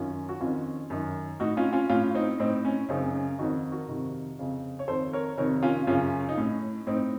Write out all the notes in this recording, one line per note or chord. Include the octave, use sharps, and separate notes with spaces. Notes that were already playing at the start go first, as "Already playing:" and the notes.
Already playing: F#2 D#3 C#4 F4
F#4
F2 D#3 C#4 F4
F#2 D#3
A2 D#4 F#4
C#4 F4
C#4 F4
A2 C#4 F4
C4 D#4
A2 C4 D#4
C#4
F#2 C#3 C4 D#4
C#4
F2 D#3 D#4 F#4
F#4 A#4
F2 C3 D#3
F2 C#3
C#5
F2 D#3 A4 C5
A#4 C#5
F2 C3 D#3 A#4 C#5
C#4 F4
F#2 C#3 C#4 F4
D#4
A2 C#4
A2 C4 D#4